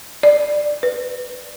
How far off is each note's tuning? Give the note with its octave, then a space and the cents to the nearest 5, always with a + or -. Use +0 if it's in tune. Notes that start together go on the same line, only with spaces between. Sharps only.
D5 +10
B4 +20